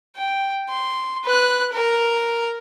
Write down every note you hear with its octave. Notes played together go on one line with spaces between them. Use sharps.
G5
C6
B4 F#6
A#4 A#5